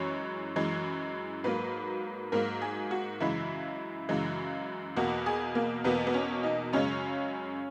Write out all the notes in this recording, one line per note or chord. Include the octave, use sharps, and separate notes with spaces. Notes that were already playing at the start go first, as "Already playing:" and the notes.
Already playing: F#2 E3 G#3 C#5
F#2 E3 G#3
G#2 F#3 A#3 B4
G#2 F#3 A#3 A#4
G#4
F#4
F#2 C#3 E3 G#3 E4
F#2 C#3 E3 G#3
E2 B2 A#3 F#4
G#4
A#3
E2 B2 A#3 B3
B3
C#4
D#4
F#2 C#3 G#3 C#4